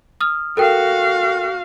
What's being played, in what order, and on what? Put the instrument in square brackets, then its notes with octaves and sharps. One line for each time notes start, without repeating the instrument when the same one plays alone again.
[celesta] D#6 F6
[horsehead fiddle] F#4 F5 [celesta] A4 A#4 G5